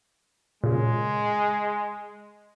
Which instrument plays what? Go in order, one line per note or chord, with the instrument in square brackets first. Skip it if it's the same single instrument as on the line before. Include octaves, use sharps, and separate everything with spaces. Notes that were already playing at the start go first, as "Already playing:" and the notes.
[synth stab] A#2 C#3 [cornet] G#3